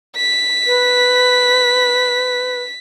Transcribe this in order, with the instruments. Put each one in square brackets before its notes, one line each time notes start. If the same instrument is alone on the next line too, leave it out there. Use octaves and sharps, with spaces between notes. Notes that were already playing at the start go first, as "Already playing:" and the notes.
[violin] B6
[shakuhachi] B4